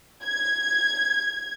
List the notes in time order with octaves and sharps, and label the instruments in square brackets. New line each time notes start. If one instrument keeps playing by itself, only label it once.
[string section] G#6